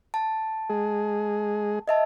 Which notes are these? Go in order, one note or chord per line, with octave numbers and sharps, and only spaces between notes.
A5
G#3 G#4
D#5 E5 A5